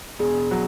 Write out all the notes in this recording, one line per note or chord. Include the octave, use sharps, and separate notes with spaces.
E1 G#4
F#3